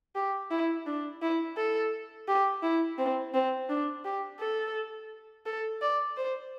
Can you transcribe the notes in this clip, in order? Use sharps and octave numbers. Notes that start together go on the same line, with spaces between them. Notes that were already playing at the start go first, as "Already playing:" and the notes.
G4
E4
D4
E4
A4
G4
E4
C4
C4
D4
G4
A4
A4
D5
C5